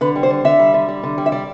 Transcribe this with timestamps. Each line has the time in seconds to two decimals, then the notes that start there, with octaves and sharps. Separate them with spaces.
0.01 D3 B4
0.16 G3
0.23 C5
0.30 D3
0.44 D3 E5
0.59 G3
0.74 D3
0.88 G3
1.03 D3
1.18 G3
1.26 E5
1.32 G3 D5